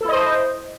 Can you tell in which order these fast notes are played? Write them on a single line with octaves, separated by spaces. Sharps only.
A4 E4 D#5 C5